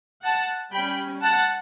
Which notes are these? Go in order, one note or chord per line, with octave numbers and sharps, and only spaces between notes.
F#5 A5
G3 C#4 G5 B5
F#5 A5